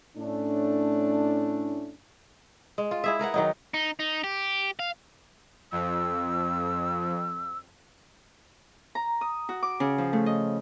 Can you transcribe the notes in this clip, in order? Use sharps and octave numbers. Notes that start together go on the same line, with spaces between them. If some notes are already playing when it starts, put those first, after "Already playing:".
A2 A3 C#4 D4
G#3
F4
E4 G#4 E5
G#4 A#4 B4 F#5
D#3 F#3 D#4
D#4
D#4
G4
F5
F2 E6
A#5
D#6
F#4
D6
C#3
F3
A3
D#5